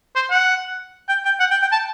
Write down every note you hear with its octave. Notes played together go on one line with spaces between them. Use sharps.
C5
F#5
G5
G5
F#5
G5
G5
A5